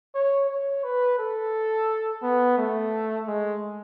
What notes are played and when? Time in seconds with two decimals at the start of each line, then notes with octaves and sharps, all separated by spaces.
0.15 C#5
0.50 C#5
0.84 B4
1.19 A4
2.23 B3
2.58 A3
3.28 G#3